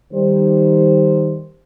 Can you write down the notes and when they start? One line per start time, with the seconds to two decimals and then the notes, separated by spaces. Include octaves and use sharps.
0.12 D#3 G3 C5